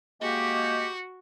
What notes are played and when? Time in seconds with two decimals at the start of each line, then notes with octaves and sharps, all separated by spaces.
0.21 G#3 A#3 F#4 G4